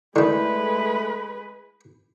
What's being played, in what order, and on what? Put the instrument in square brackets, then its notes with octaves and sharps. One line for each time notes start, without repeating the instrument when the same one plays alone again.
[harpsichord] D3 D#3 [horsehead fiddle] G#3 B4 [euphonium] A3 [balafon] E4 D5